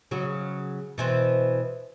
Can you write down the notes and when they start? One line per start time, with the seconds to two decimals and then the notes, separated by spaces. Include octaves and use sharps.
0.11 C#3 F#3 F#4
0.98 B2 E3 C4